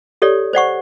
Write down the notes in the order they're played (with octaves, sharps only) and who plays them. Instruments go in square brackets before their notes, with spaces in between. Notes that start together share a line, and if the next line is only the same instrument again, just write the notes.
[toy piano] G4 A4 C#5 D5
C5 D5 F#5 C#6